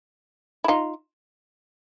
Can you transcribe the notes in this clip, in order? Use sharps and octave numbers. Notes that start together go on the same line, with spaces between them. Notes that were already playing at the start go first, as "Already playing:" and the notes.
E4
D#4 F4